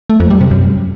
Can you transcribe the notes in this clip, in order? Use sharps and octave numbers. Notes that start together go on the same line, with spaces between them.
A3
F2
G3
C3
F#2